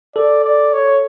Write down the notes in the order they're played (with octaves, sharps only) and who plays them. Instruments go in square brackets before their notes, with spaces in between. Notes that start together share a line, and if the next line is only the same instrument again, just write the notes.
[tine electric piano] A4 [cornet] D5
[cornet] D5
C#5